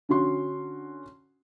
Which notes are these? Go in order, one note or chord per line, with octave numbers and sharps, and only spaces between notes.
D3 C#4 F#4 C6